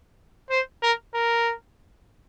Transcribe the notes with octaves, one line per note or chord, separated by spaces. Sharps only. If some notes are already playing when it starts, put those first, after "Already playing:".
C5
A#4
A#4